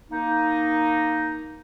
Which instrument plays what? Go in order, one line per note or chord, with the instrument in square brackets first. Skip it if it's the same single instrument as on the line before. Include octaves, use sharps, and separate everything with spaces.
[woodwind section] A#3 D#4